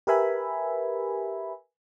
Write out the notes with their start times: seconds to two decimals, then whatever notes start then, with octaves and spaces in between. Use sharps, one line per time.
0.07 G4 A#4 B4 E5 G#5 B5